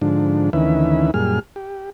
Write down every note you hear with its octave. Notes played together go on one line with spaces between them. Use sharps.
G#2 D3 F3 D4
D2 D#3 E3 C#4 B4 E5
F#2 A#2 G3 G#4 F6
G4